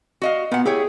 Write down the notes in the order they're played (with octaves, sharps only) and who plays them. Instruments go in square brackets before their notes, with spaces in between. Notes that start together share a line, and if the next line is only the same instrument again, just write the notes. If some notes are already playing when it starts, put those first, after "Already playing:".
[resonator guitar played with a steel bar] F#4 D#5 F5
[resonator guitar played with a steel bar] A#2 F#5 [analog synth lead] B3
[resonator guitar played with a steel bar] E4 G4 C#5 [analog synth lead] G#4